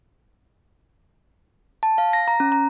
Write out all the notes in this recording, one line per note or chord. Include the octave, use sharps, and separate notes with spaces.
A5
F5
A#6
A#5
C#4
A#5